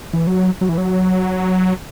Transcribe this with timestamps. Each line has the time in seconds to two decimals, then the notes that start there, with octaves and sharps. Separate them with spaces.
0.13 E3
0.27 F#3
0.61 F#3
0.69 E3
0.78 F#3